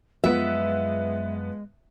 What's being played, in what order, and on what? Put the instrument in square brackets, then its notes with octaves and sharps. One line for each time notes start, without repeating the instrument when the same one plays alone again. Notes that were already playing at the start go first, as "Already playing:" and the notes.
[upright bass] F#2 [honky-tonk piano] F3 B3 [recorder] G#3 [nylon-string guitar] E5